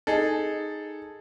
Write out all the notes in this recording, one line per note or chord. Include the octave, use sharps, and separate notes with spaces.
D#4 G#4 A4